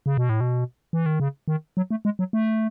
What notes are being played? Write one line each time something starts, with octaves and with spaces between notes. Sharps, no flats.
C#3
B2
A2
B2
E3
D#3
C#3
D#3
F#3
A3
G#3
F#3
A3